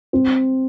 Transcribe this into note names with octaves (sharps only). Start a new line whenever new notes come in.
C4